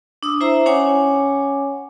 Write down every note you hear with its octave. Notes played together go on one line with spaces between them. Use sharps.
D4 D#6 E6
E4 C5 E5 A#5
C#4 C#5 F#5 G#5 D6